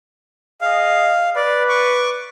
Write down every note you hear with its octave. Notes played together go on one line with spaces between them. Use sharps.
G#4 D#5 F5
B4 D5
C#6 D6